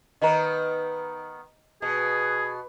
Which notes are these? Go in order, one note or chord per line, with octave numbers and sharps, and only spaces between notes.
D#3 B3 D#5 A#5
B2 G#4